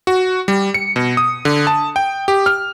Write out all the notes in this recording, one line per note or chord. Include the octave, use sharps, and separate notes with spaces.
F#4
G3
C#7
B2
D#6
D3
A5
G5
G4
F6